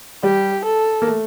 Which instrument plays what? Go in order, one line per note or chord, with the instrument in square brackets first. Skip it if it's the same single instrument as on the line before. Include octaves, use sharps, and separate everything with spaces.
[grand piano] G3 [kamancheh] G4
[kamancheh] A4
[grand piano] A#3
A3